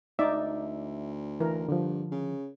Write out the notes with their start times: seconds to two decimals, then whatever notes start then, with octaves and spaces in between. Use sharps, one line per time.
0.19 D2 D#4 D5 E5
1.40 E3 A#4
1.69 G2 D3 F3
2.11 C#3